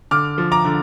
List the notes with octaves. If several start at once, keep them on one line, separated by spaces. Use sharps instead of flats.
D3 D6 F6
F3
A#5 D6
D3